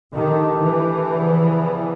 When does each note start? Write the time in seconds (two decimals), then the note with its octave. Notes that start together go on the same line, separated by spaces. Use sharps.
0.13 D#3 A3 D4 G4
0.63 E3
1.13 E2 C#3 F3